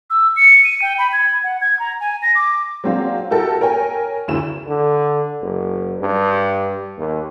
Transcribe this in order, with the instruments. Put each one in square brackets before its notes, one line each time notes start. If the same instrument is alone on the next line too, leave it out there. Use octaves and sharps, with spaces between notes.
[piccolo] E6
C#7
D#7
G5
B5
G#6
F#5
G#6
A#5
G#5
A#6
D6
[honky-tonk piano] F#3 G#3 A#3 C4 D4 F4
E4 F#4 G4 A4 A#4
A#4 C#5 G5 G#5
F#1 D2 E4 G#4 E7
[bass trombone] D3
F#1
G2
D#2